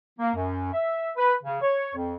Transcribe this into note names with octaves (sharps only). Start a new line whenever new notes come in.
A#3
F#2
E5
B4
C#3
C#5
F2